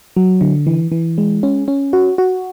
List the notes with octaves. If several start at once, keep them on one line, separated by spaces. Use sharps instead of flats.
F#3
D3
E3
E3
G#3
C#4
C#4
F#4
F#4